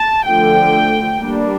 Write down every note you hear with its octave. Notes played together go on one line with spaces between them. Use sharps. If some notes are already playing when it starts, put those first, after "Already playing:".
Already playing: A5
D3 F3 A3 G5
G3 A#3 D4